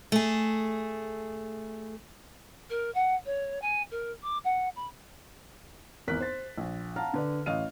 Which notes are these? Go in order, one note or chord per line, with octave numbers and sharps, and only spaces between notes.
A3 G#4
A#4
F#5
C#5
G#5
A#4
D6
F#5
B5
G#1 E2 A#4 F#6 B6
C5 A6
A#1
F5 F#5 A5 A#5 F6
D3 B4 D5
A1 D#5 F5 F6 D#7